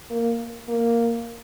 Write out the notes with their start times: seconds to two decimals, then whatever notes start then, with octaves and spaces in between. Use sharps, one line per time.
0.10 A#3
0.68 A#3